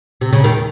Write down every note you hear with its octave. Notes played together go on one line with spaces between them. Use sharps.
C3
C#3
D#2 D#3